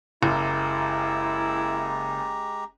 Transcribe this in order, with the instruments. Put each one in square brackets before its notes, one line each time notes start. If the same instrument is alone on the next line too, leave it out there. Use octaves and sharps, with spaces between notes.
[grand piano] F#1 [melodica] G#3 G4 A#5 [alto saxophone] E4